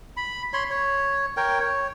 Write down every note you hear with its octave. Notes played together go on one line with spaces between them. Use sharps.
B5
C#5 B5 C6
C#5
A#4 C#5 G5
C#5